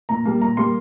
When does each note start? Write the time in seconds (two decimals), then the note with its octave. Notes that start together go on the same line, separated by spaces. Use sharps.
0.09 A#2 A#5
0.25 G3 A#3
0.41 A#2 A#5
0.57 G3 A#3 C6